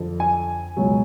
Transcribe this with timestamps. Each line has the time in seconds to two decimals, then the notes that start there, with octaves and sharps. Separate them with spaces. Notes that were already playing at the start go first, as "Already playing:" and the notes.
Already playing: F2 D3 F3
0.20 G#5
0.77 C#2 B2 F#3